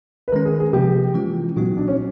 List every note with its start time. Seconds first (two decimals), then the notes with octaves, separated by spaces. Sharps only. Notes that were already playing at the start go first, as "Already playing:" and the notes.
0.28 B4
0.32 D#3 G#3 C#4 A#4
0.45 G#4
0.60 G#4
0.73 C3 F3 A#3 G4
1.14 E3 G#3 C#4 F4
1.56 A#2 F#3 B3 D#4 F#4
1.77 D4
1.88 C#4